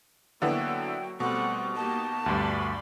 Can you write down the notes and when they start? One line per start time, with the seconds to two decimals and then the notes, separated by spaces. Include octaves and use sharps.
0.42 D3 F#3 A#3 B3 E4 F#4 G5
1.20 B2 G3 A3 C4 F#5
1.76 A#3 D#4 G4 A5
2.26 D2 G2 D5 B5 C6